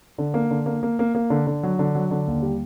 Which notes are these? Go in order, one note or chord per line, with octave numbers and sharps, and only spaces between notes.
D3
A#3
D3
A#3
A#3
A#3
A#3
D3
D3
F#3
D3
F#3
D3
D#2
G3